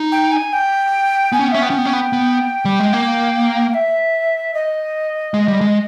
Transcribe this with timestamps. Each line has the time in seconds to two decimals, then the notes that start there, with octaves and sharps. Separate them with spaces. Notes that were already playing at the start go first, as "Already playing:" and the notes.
Already playing: D#4
0.11 G5
0.31 G#5
0.52 G5
1.32 B3 G#5
1.39 C#4 G5
1.48 B3
1.51 C#4 E5
1.61 B3 G5
1.70 C#4
1.78 B3
1.85 C#4
1.93 B3
2.13 B3
2.65 G3
2.80 G#3
2.93 A#3
3.73 E5
4.54 D#5
5.34 G#3
5.48 G3
5.61 G#3